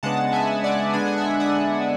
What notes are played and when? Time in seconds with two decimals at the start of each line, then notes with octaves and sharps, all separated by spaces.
0.03 C#3 G#3 B3 D4 F#5 A5
0.33 E5 G#5
0.64 D5 F#5
0.94 D3 G#3 B3 D4 G#5
1.05 F#5
1.16 E5 G#5
1.40 D5 F#5